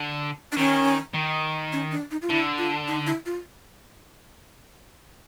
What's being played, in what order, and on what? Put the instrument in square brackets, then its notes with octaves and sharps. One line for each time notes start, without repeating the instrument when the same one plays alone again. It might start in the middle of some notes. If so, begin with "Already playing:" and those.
Already playing: [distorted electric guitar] D3
[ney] D4
[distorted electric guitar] D#3 [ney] C#4
[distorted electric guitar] D#3
[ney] C#4
D4
D#4
F4
[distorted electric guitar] D3 [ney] E4
[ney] F4
D#4
E4
F4